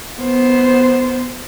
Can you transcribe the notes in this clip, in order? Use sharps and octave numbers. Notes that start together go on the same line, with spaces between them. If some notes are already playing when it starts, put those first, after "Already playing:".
B3 C5